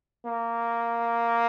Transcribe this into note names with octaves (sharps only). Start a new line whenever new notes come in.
A#3